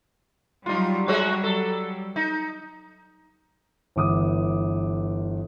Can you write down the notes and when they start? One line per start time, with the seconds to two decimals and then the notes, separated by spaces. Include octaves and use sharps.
0.66 F#3 G3 D#4 F4
1.08 G#3 F#4 C#5
1.44 A4
2.16 D#4
3.96 G1 E3 D6 D#6